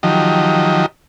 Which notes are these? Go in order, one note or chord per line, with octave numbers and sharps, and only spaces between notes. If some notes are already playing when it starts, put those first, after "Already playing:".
D#3 F3 F#3 G4 D#5